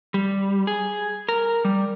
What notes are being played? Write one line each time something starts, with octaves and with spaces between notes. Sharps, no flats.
G3
G#4
A#4
G3